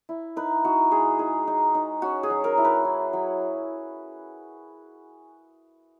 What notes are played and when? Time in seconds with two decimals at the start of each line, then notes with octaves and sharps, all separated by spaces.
0.09 E4
0.36 D#4 B4
0.65 D#4 F#4
0.91 G#3 G#4
1.19 D#4 G#4
1.47 D#4
1.75 D#4
2.02 C#4 F#4
2.23 G#4
2.30 F#3
2.44 A#4
2.58 E4
2.65 B4
2.85 E4
3.13 F#3